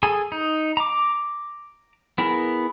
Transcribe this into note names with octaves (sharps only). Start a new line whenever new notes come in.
G#4 A4 G#5
D#4
A#5 D6
B3 E4 G#4 A#4